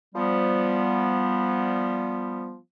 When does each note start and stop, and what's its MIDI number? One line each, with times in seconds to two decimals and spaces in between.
0.15 2.57 53
0.15 2.57 55
0.15 2.57 59